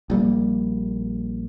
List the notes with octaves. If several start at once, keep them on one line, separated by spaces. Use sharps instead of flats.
A#1 G3 A#3